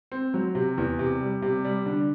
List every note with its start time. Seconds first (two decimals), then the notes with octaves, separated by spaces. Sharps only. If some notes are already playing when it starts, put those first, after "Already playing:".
0.12 C4
0.34 F#3
0.55 C3
0.78 E2
0.99 C3
1.21 G3
1.42 C3
1.64 G3
1.86 D3